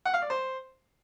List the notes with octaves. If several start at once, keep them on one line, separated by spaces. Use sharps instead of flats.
F#5
F5
D5
C5